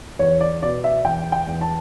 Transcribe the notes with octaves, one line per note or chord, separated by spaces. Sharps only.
E2 C#5
D5
B2 D5
E5
E2 G5
G5
E2
A5